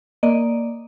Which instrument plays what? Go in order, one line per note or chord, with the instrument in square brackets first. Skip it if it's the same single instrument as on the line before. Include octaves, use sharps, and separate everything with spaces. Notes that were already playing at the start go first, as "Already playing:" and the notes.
[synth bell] A#3 D5 D#5